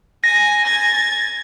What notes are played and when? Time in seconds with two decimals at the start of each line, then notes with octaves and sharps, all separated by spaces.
0.24 G#5 A#6
0.64 G#6 A6